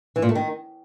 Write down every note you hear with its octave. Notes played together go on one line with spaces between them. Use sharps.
E3
A#2
A3
D#3